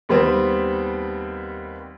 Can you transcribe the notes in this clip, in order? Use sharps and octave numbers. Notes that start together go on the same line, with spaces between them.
D#2 G3 B3 C4